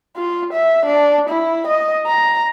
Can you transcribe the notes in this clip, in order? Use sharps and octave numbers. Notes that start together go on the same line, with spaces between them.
F4
E5
D4
E4
D#5
A#5